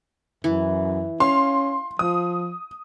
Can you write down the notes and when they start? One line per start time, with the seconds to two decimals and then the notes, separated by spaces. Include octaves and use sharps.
0.44 F#2 E3
1.20 C#4 F5 C6
1.99 F3 D#6